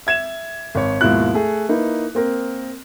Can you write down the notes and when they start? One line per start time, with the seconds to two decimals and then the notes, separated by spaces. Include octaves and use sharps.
0.07 E5 G#6 E7
0.75 G#1 C#5
1.01 D#2 G#2 B2 F3 E4 F#6
1.34 A3 G#4
1.69 A#3 D#4 E4 B4
2.15 A#3 C4 A#4